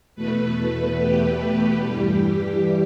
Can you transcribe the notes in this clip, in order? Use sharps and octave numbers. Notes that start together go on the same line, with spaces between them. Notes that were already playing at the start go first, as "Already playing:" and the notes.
E2 B2 A3 B4
G4
G2 E3 G3